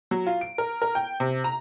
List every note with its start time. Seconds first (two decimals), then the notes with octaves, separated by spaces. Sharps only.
0.11 F#3
0.27 F4
0.41 D7
0.58 A#4
0.82 A#4
0.95 G5
1.20 C3
1.44 A#5